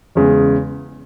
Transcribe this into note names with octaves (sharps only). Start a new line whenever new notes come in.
E2 C#3 G#3